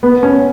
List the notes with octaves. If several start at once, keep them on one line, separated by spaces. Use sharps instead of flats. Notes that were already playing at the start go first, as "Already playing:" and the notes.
B3
C#4